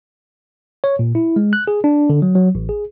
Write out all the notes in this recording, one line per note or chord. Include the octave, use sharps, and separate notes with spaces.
C#5
A#2
E4
G#3
F#6
G#4
D4
D3
F#3
F#3
A1
G#4